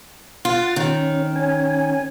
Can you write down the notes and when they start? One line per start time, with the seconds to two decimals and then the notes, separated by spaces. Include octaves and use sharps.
0.45 F4 F#5 A6
0.76 D#3 C#4
1.36 C#4 G#5